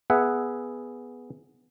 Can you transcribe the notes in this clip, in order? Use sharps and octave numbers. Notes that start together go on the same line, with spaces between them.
B3 G#4 E5 F#5